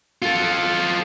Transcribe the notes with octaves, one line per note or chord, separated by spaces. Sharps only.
F4 A4